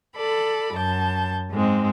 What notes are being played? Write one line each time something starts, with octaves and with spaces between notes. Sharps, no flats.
A4 D5 B5
F#2 A5 G6
G#2 G#3 C4